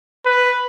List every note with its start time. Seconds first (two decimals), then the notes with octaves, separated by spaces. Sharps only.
0.26 B4